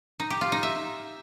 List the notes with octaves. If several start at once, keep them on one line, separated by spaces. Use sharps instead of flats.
D#4
G4
F4
D#4
E5